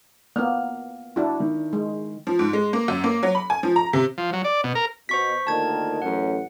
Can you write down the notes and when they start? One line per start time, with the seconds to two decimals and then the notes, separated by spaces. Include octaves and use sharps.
0.36 A#3 B3 F6
1.16 D4 E4 F#4
1.40 D#3
1.73 G#3
2.27 F3
2.39 G#2
2.53 G#3
2.73 A#3
2.88 F#2
3.04 A#3
3.23 F#3
3.35 B5
3.50 G#5
3.63 F3
3.76 A#5
3.93 C3
4.18 F3
4.33 F#3
4.44 D5
4.64 B2
4.75 A#4
5.09 B2 C5 C#6 B6
5.47 D2 A#2 D#3 A5 G#6
6.02 A1 F#2 F#5